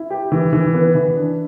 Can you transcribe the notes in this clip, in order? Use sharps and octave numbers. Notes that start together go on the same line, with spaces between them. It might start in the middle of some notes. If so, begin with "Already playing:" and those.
Already playing: E4
G4
E3
E3
B3
E3
D4